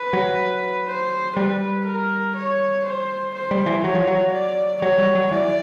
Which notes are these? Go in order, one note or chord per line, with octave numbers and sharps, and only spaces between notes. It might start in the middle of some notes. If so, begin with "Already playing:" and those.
Already playing: B4
F#3
C5
G3 B4
A#4
C#5
C5
C5
G3
E3
F#3 C#5
F3
F#3
D5
F#3 C#5
G3
F#3
E3 D5